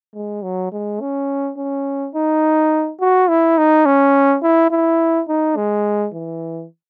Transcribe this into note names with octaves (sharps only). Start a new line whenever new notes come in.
G#3
F#3
G#3
C#4
C#4
D#4
F#4
E4
D#4
C#4
E4
E4
D#4
G#3
E3